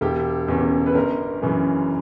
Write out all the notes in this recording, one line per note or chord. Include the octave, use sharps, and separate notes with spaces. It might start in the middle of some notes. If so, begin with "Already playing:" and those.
E1 G4
E2 C#3
B4
G1 A#4
F#2 C#3 E3